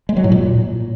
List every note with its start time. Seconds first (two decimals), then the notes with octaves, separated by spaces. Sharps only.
0.09 G#3
0.17 F#3
0.24 A2
0.32 A#2